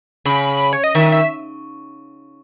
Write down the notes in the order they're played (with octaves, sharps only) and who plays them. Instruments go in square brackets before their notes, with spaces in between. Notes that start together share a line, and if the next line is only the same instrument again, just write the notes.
[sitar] C#3 [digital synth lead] B5
[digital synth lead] C#5
D#5
[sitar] D#3 [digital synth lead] E5
[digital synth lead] E5